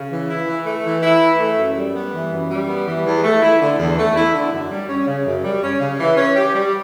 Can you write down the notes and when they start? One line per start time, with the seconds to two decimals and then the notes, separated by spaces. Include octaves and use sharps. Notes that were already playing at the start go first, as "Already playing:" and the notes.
Already playing: C#3
0.10 E3
0.30 E4
0.48 E3
0.66 A3
0.85 E3
1.03 E4
1.22 E3
1.40 A3
1.58 F#2
1.76 G3
1.95 B3
2.14 E3
2.32 F#2
2.51 G3
2.68 B3
2.87 E3
3.05 E2
3.23 A3
3.42 E4
3.61 D3
3.79 E2
3.98 A3
4.16 E4
4.34 D3
4.53 F#2
4.71 G3
4.89 C#4
5.07 C#3
5.26 F#2
5.44 G3
5.63 C#4
5.80 C#3
6.00 E3
6.17 C#4
6.36 G4
6.54 G3